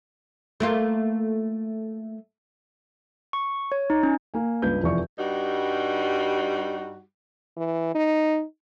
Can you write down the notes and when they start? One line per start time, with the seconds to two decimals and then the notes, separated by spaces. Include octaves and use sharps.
0.60 A3 A#3 F4
3.33 C#6
3.72 C#5
3.90 D#4
4.03 C#4
4.34 A#3 G#5
4.62 C#2 G2 D4 B4 G6
4.83 F1 E2 F3 D5 E5 C#6
5.18 G2 G3 D#4 F#4
7.57 E3
7.95 D#4